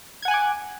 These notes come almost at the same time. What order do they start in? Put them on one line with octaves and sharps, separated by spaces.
G#6 F#5 G#5 F#6 D6